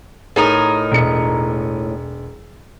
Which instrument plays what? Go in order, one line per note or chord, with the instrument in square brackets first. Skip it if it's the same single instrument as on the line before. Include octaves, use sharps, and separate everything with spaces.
[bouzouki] A2 D#4 A#4 [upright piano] G#4
[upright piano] E1 C#7